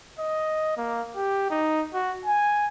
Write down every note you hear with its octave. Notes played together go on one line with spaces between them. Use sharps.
D#5
A#3
G4
D#4
F#4
G#5